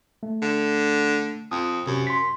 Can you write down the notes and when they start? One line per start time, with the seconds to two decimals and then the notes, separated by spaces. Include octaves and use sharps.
0.23 A3
0.42 D3
1.51 F2 D#6
1.87 F#2 C3
2.07 C6 B6